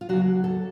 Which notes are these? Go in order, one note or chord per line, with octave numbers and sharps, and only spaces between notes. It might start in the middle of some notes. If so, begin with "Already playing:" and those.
F4
D#2 C#3 F#3 F#4
A4